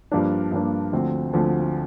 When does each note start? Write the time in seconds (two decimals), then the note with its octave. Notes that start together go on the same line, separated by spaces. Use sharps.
0.11 G2 F3 A#3 D4
0.52 G2 F3 A#3 D4
0.92 D2 D3 F3 C4
1.33 D2 D3 F3 C4